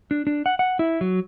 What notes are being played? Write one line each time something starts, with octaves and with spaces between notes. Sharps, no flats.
D4
D4
F#5
F#5
E4
F#3